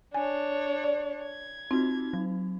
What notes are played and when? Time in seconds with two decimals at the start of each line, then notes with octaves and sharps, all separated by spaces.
0.14 D4 C#5 G#5
0.84 D5
1.24 G#6
1.71 C4 D#4 F4 F#4
2.13 F#3